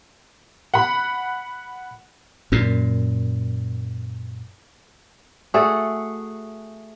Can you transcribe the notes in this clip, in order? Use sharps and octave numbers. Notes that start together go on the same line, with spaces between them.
F#5 B5
F#2 A#2
A3 F#4 G#4 A4